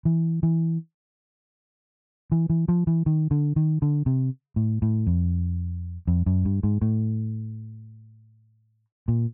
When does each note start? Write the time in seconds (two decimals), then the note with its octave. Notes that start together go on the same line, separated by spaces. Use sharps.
0.05 E3
0.43 E3
2.32 E3
2.50 E3
2.68 F3
2.87 E3
3.06 D#3
3.31 D3
3.56 D#3
3.82 D3
4.06 C3
4.56 A2
4.82 A2
5.07 F2
6.07 F2
6.26 F#2
6.45 G2
6.63 G#2
6.82 A2
9.08 A#2